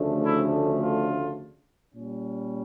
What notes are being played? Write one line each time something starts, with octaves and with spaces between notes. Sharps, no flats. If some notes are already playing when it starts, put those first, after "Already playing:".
Already playing: D2 C#3 F3 A3 D4
E4
F4
A#2 G3 C#4